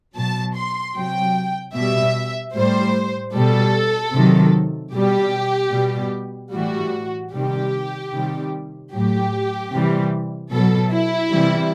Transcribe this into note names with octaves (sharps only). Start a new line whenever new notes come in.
B2 F#3 A5
C6
C3 F#3 G5
B2 G3 E5
A2 G3 C5
B2 G3 A4
C3 D#3 F#3
B2 G3 G4
B2 G3
A2 E3 G3 F#4
C3 D#3 G3 G4
C3 D#3 G3
A2 F#3 G4
C3 E3 G3
B2 F#3 A4
E4
C3 E3 G3